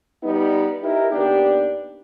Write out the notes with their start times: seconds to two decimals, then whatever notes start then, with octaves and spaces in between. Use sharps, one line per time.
0.23 G3 B3 D#4
0.83 D#4 E4 G4 A#4
1.12 D#2 B3 D4 G4